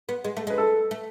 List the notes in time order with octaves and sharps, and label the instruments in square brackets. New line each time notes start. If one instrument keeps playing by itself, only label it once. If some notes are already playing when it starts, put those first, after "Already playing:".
[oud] B3
G#3
A3
[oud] G#3 [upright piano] B4
[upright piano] A4
[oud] A3